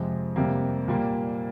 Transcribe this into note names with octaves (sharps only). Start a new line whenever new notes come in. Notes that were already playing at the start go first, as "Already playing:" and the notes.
Already playing: F2 C3 F3 G#3
F2 C3 G3 A#3
A#2 G3 A#3